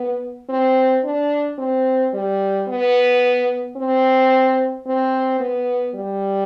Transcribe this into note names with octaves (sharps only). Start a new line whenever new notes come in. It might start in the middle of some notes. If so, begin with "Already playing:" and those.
Already playing: B3
C4
D4
C4
G3
B3
C4
C4
B3
G3